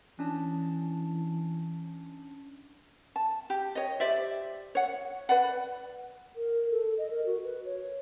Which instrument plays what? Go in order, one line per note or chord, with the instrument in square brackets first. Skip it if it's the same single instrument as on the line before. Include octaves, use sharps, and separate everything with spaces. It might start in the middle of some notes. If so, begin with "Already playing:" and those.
[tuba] E3 [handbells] C#4 D4 A5
[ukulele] A5
G4
C#5 D#5
G4 C5 D5 E5
C#5 F#5
B4 D5 F#5
[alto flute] A#4
A4
D#5
A#4
F#4
B4
C#5